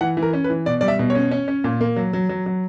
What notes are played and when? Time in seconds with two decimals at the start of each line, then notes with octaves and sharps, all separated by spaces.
0.01 E3 F#5
0.17 E3
0.22 A#4
0.33 C#4
0.44 B4
0.50 E3
0.66 B2 D5
0.81 G3 D5
0.88 E5
0.99 B2
1.10 C#5
1.15 C#4
1.31 C#4
1.48 C#4
1.64 A#2
1.81 A#3
1.96 F#3
2.13 F#3
2.29 F#3
2.46 F#3